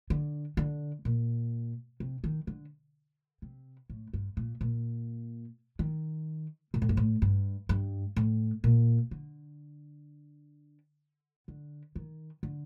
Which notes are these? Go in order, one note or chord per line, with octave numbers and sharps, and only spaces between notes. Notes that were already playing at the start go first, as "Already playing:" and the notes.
D3
D3
A#2
C3
D#3
D3
C3
A2
G2
A#2
A#2
D#3
A#2
A2
G2
A2
G2
G2
A2
A#2
D3
D3
D#3
D3